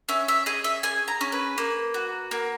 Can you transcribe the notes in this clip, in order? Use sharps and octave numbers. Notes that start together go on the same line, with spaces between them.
C#4 E5
E5
G#4 D#5
E5
G#4 G#5
A#5
C#4
B4
A#3
F#4
A#3